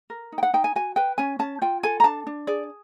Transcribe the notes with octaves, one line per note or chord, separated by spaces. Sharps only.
A#4
D#4
G5
F#5
D#4 G5
G#5
F#4 G#5
B4 G5
C#4 G#5
C#4 A5
F4 G5
A4 G#5
A#5
D4 A5
D4
G#4 D5